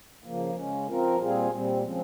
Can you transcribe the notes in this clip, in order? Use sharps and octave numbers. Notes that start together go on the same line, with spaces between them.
C#3 F3 A#3
C#3 G#3 C#4
F3 C4 F4 A#4
A#2 G3 C4 F4 G#4
A#2 G3 C4
C#3 F3 G#3 C4